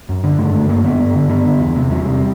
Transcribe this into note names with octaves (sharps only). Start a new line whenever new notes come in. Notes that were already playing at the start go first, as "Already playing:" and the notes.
F#2
D3
G2 A3
D3 A3
G2 A#3
D3 B3
G2
D3
G2 B3
D3
E2
C3
E2 G3
C3